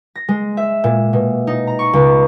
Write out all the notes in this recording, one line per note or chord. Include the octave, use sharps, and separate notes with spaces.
A#6
G#3
E5
A#2
B2
D#4
A#5
C#6
C#2